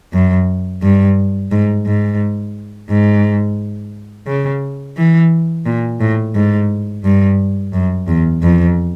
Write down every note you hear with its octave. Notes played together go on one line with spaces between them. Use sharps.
F#2
G2
G#2
G#2
G#2
C#3
E3
A#2
A2
G#2
G2
F#2
E2
F2